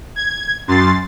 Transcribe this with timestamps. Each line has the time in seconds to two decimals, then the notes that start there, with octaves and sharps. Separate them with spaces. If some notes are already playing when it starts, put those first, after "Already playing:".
0.16 G#6
0.68 F#2 C6 A6